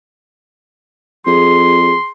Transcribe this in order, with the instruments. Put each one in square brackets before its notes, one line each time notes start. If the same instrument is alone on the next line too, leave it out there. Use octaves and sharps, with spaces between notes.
[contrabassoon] F2 [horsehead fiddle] G#4 [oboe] C6